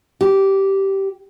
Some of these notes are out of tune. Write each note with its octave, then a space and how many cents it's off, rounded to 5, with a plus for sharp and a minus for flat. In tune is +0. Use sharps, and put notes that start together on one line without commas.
G4 -15